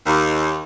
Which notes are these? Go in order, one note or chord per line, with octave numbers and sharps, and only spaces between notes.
D#2